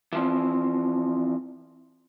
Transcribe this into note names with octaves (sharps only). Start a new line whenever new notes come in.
E3 F3 C4